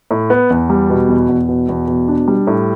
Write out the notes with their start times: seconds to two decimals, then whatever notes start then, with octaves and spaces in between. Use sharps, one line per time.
0.11 A2
0.30 B3
0.50 E2
0.70 G3
0.90 B2
1.09 E2
1.29 E2
1.49 B2
1.69 E2
1.88 B2
2.08 D4
2.28 G3
2.47 A2